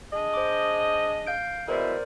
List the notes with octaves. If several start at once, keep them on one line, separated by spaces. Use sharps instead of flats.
D4 G#4 D#5
C5 D6
F5 G6 D7
B2 G#3 E4 A#4 C5 D5